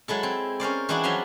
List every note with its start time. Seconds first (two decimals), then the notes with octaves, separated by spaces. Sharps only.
0.08 F#3 G#3 E4 A4
0.23 C4
0.60 C#4 A#4 C5 D5
0.89 E3 G#3 C4 D4 E4 F#4
1.04 F3 F#3 E5 G#5 A#5 C6